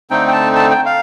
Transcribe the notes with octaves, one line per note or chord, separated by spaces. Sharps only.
D3 A3 C4 D#4 G5
G5
A5
A5
G5
F5